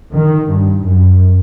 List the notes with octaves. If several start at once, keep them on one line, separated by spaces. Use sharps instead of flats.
D#3
G2
F#2